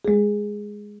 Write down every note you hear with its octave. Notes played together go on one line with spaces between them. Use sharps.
G#3 G#4